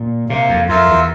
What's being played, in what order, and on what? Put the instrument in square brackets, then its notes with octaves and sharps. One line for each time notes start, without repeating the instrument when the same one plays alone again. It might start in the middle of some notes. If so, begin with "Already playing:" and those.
Already playing: [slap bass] A#2
[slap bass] C3 [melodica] A#3
[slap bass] F2
[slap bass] F2 [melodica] F4 A#4 E5
[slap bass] E2